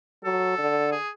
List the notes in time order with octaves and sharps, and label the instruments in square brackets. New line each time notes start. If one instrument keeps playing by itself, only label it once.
[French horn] F#3 [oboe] A4
[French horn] D3
[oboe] G#4